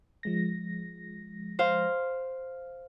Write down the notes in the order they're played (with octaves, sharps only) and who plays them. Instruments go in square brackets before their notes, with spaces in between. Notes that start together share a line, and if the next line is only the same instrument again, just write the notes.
[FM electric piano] F3 G#3 A#6
[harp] C5 F5